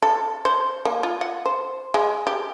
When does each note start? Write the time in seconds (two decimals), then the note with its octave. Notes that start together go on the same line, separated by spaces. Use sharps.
0.02 A4
0.45 C5
0.85 A#3
1.03 F4
1.21 F#5
1.45 C5
1.94 G#3
2.27 G4